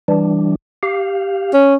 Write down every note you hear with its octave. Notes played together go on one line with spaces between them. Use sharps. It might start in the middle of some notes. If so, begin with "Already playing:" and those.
E3 G3 D4
G4 F5
C#4